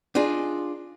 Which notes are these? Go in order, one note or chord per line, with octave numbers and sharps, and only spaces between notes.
D4 D#4 F4 G#4